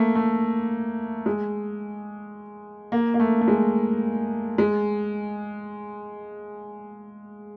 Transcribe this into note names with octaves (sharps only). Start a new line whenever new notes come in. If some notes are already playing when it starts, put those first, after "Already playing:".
Already playing: A3 A#3
A3
G#3
A#3
A#3
A3
A3
G#3
G#3